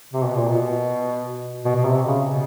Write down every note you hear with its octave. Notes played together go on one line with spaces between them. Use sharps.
C3
B2
A#2
B2
B2
B2
C3
C#3
B2